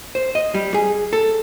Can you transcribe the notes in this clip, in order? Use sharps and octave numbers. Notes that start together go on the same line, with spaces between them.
C5
D#5
G3
G#4
A4